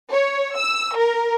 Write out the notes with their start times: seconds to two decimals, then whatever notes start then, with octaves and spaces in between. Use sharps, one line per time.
0.11 C#5
0.55 E6
0.97 A#4